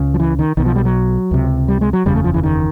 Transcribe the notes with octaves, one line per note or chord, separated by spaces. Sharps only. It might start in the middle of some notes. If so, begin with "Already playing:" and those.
Already playing: C#2 C#3
F3
E3
D#3
B1 B2 D#3
F3
G3
F#3
C#2 C3
G3
G#3
F#3
F#1 E2 C#3 G3
A3
F3
E3
D#3